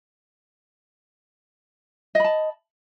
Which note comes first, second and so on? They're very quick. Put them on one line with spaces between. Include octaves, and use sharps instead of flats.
D#5 B5 A5